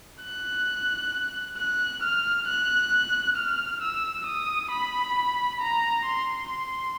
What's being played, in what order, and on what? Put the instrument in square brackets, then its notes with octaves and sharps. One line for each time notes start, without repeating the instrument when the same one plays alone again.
[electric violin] F#6
F#6
F6
F#6
F6
E6
D#6
B5
A#5
C6
C6